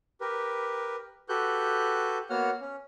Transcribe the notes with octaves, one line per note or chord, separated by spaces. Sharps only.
G4 A#4 B4
F#4 G4 A4 B4 F#6 G6
A#3 B3 F#4 C#5 F#5 F6
C#4